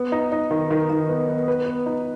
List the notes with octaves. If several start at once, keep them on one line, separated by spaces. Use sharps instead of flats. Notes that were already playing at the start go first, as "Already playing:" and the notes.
Already playing: B3
D#4
D#4
D#3
D#3
D#3
B3
B3
B4
B3
D#4